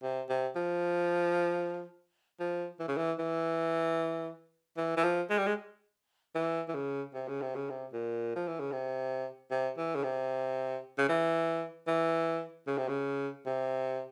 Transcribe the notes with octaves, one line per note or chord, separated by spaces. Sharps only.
C3
C3
F3
F3
E3
C#3
E3
E3
E3
E3
F3
G#3
G3
G#3
E3
E3
C#3
C3
C#3
C3
C#3
C3
A#2
F3
E3
C#3
C3
C3
E3
C#3
C3
C#3
E3
E3
C#3
C3
C#3
C3